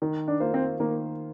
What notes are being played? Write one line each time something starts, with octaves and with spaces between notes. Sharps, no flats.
D#3
D4
A#3 F4 C5
C4
D#3 A#3